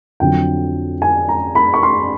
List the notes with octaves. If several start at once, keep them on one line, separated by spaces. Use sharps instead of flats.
F2 D3 F#3 G5
G#5
A#5
B5
C#6
C6